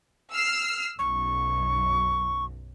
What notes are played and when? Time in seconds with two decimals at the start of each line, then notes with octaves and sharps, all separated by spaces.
0.32 E6 F6 C7
0.99 B1 F#2 C#6